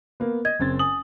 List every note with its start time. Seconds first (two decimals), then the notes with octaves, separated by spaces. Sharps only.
0.20 A#3 B3
0.45 D#5 G#6
0.59 F#1 C4 A6
0.79 G#5 D#6 F#7